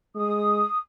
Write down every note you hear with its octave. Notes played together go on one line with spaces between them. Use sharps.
G#3 D#6